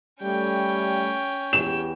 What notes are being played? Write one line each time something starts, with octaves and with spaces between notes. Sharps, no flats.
G3 A3 C#4 G5
E2 G4 E7